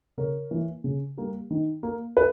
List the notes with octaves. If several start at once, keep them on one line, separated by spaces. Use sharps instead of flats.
C#3 A#4 C#5
E3 A#3
C#3
G3 A#3
D#3
A#3
B4